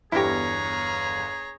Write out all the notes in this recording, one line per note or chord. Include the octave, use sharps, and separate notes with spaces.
G1 E2 E4 G4 G#4 C#5 A#5 A#6